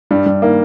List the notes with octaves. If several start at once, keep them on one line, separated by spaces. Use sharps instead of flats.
G2 G3
G2 G3
D#3 A#3